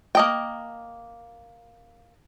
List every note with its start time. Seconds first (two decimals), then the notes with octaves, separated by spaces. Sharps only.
0.15 A#3 D#5 G5